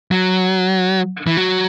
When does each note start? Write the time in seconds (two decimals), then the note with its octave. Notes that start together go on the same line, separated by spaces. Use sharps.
0.11 F#3
1.27 E3
1.37 F#3